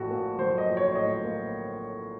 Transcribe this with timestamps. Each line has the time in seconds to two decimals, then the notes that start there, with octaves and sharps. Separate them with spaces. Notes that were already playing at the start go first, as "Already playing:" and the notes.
Already playing: A#1 A2 F#4 A4
0.10 A#3
0.39 F#3 C5
0.58 D#5
0.67 A#1
0.77 C#5
0.96 A2 D#5
1.24 A#3